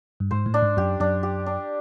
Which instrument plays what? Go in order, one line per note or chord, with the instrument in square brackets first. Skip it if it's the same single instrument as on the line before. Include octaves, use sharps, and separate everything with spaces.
[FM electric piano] G2
[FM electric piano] G#2 [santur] C5
[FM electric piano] A2
[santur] D4
[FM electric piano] G#2
[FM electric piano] F#2 [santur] G4
[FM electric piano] F#2 [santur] D4
[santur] G4
D4